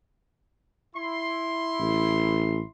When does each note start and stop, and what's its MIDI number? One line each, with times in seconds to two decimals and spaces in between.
0.95 2.70 64
0.95 2.70 84
1.79 2.63 33